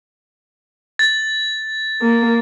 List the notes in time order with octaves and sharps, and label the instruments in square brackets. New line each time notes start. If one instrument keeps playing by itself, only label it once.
[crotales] A6
[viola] A#3